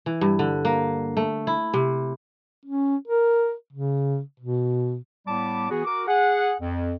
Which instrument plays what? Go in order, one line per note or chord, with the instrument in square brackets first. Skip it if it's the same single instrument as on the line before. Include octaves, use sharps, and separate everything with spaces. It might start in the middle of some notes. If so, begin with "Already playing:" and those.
[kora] E3
G2
D3
A#3
A3
E4
C3
[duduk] C#4
A#4
C#3
B2
[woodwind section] A2 G3 B3 D5 A5 D6
E3 B3 F#4 G#4
F#4 A#4 D6
G#4 F#5
F2